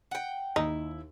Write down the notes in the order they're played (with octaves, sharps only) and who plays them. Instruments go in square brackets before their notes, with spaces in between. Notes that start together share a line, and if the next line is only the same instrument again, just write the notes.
[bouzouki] F#5 G5
[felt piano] D#2 [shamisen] D#4 [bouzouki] E4